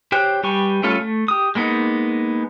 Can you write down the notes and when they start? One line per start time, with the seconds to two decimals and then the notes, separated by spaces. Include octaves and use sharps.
0.12 G4 C5 C#5 G5 F#6
0.43 G3 G4 B4 G#5 C#6
0.83 G3 A3 C#4 F4 A4
1.00 A3
1.28 G4 D#6
1.55 G#3 A#3 B3 D#4